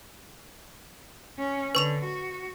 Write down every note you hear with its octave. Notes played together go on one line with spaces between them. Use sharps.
C#4
D3 B4 C#6 F7
F#4